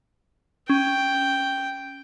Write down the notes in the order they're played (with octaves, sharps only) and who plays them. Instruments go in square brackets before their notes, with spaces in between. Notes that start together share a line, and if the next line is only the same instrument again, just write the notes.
[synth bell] C#4 [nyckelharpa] G5